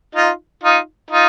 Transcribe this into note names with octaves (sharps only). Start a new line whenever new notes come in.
D#4 F4
D#4 F4
D#4 F4